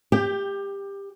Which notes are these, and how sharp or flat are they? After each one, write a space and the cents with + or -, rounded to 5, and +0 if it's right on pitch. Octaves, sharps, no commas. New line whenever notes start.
G4 +20 G5 +0